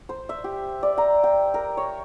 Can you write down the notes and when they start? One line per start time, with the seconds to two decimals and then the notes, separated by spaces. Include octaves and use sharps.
0.09 C5
0.29 E5
0.44 G4
0.83 D5
0.98 A#5
1.23 G5
1.54 A#4
1.77 C#5